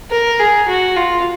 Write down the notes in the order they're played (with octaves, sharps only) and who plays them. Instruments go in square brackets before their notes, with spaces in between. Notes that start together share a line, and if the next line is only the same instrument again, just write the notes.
[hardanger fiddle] A#4
G#4
F#4
F4